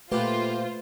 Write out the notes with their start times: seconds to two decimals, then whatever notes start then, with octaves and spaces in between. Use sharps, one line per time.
0.12 A#2 A3 F4 G4 B4 C5 F#5